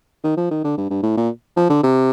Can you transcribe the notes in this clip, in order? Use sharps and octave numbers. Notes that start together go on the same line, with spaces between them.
D#3
F3
D#3
D3
G2
G2
A2
A#2
F3
D3
C3